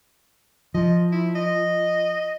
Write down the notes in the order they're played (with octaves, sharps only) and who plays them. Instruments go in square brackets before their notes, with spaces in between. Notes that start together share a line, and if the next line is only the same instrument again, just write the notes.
[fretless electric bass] F3 [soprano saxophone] D#5
[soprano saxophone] E4
D#5